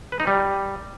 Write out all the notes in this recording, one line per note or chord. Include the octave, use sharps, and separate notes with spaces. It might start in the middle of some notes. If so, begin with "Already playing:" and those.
B4
D#4
G3